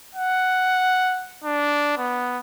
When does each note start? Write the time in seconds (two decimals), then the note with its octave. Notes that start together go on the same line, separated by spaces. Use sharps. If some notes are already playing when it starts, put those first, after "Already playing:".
0.15 F#5
1.44 D4
1.98 B3